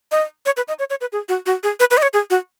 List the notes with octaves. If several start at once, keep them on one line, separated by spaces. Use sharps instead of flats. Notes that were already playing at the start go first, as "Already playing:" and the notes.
D#5
C#5
B4
D#5
C#5
C#5
B4
G#4
F#4
F#4
G#4
B4
B4
D#5
C#5
G#4
F#4